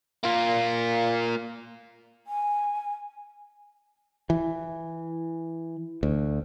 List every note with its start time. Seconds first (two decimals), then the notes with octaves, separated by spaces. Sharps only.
0.24 A#3 F4
2.27 G#5
4.30 E3
6.03 D2